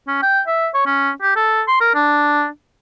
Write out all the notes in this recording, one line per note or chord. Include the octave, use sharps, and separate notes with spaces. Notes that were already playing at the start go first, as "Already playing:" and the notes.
C#4
G5
E5
C#5
C#4
G4
A4
C6
A#4
D4